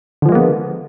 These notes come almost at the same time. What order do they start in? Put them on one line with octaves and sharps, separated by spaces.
D3 F3 G#3 A#3 B3